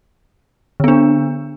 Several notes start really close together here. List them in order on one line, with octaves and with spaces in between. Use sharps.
D3 B3 D4